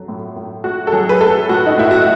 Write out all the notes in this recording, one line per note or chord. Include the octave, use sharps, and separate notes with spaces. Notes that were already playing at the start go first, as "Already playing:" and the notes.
Already playing: F#3 A3
A2
A2
A3 F#4
A4
F#3 G#4
B4
A3 A4
A2 F#4
D#4
A2 E4
F#4